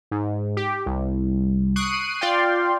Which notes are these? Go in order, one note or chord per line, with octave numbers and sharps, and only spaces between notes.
G#2
G4
C2
C#6 D#6 F#6 C7 D7 D#7
F4 D5 F5 G5 C6